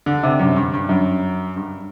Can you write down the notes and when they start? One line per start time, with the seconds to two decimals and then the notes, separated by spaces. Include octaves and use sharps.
0.06 D3
0.23 C3
0.40 F#2
0.56 G2
0.74 G2
0.89 F#2
1.56 G2